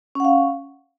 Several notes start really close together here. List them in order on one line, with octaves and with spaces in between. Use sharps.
C#4 F#5 F5